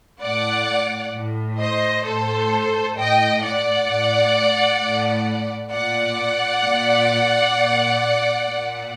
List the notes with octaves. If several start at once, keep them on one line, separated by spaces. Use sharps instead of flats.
A2 D5 F#5
A2
C5 D#5
A2 A4 C5
A2 D#5 G5
D5 F#5
A2
A2
A#2 D5 F#5
A#2
A#2
A#2